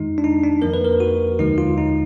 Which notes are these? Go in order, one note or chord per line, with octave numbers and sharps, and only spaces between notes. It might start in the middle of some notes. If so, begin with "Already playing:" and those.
Already playing: F2 D#3 G#3 D#4
D4
D#4
D4
F2 F3 A#3 A#4
B4
A#4
F#4
D#2 D3 F3 G#3 D#4
F4
D#4